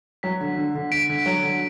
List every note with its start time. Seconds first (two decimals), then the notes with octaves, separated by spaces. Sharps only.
0.23 F#3 B6
0.41 D3
0.57 D3
0.75 D3
0.92 D3 B6 D7
1.09 D3
1.26 F#3
1.43 D3